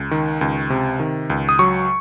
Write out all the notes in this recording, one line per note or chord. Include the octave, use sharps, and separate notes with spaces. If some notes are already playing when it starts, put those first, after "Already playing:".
Already playing: C#2
D#3
C#2
C3
D#3
C#2
D#6
F#3 C#6